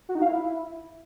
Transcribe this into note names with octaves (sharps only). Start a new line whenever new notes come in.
F#4
D#4
F5
E4